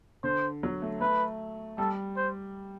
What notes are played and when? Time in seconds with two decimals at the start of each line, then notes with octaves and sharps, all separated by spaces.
0.24 D3 C5
0.63 F#3
0.82 A3
1.01 A3 B4
1.78 G3 A4
2.17 C5